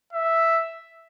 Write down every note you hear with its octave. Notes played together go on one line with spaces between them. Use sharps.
E5